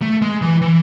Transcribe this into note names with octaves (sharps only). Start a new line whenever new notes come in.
A3
G#3
E3
E3